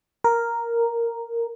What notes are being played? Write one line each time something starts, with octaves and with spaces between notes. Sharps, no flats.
A#4